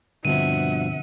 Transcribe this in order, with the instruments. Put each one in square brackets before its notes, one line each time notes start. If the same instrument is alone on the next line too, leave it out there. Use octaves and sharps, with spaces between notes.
[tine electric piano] G2 B2 F3 [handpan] D3 C4 [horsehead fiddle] E5 F#5 [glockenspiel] D#7